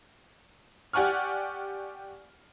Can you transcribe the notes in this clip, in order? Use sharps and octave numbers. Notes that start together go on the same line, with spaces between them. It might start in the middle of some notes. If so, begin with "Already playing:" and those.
G4 D5 F#5 G#5 C#6 F6